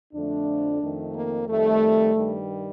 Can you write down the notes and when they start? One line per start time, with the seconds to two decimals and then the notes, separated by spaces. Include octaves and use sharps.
0.13 F2 D3 F3 A3 D4
0.81 F2 D#3 A3
1.14 A#3
1.48 F2 D#3 G3 A3
2.14 G2 D#3 G3